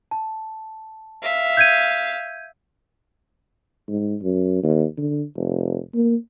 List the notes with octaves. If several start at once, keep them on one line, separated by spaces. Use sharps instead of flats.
A5
E5 F5
G6 G#6 D#7
G#2
F#2
D#2
D3
F1
A#3